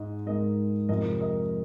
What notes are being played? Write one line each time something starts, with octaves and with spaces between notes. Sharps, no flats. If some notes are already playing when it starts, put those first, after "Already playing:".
Already playing: G#2 G#3 D#5
G#2 G#3 A#4 D#5
F2 C3 F3 G#3 A#4 D#5
A#4 D#5